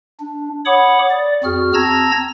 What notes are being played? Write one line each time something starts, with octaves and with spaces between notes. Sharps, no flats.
D4
C#5 F#5 B5 D6 D#6
D5
F2 C4 F#4 G#4 F6
C4 A5 A#5 E6 G#6 A#6